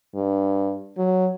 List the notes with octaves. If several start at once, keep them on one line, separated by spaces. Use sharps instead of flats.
G2
F#3